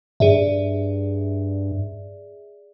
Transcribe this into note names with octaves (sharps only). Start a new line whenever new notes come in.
G2 G#4 D5 E5